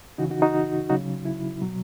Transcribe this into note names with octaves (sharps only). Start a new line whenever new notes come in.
C#3 E3 D#4 F#4
D#4 F#4
D#4 F#4
C#3 F#3 D#4 F#4
E4
B2 F#3